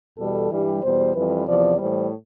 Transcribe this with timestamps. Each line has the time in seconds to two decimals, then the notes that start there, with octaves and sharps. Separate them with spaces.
0.18 E2 B2 G3 A4
0.51 G2 E3 G3
0.82 E2 B2 G3 C5
1.15 F2 E3 G3 B4
1.46 E2 C3 F3 D5
1.78 A2 E3 G3 C5